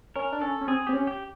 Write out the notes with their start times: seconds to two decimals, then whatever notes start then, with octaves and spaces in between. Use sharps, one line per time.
0.16 C#4 A#4
0.32 D4
0.41 C#4 A4
0.61 C#4
0.67 C4 G#4
0.87 C4 G4
0.94 C#4
1.07 G4